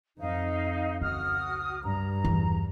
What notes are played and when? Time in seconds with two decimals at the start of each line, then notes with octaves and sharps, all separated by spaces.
0.19 F2 D#4 F5
1.01 C#2 F#4 D#6 F6
1.82 G2 A#5
2.25 E2